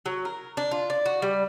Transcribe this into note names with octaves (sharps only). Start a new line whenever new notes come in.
F#3
A#4
D4
F4
D5
F#4
G3